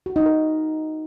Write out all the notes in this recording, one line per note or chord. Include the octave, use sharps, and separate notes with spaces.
F#4
D#4
A#4